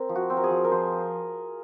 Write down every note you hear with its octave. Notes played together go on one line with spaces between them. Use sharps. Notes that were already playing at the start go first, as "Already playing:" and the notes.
Already playing: C4 A#4
F3
F#4
C4
A#4
G#4
F3
A#4
F3 C5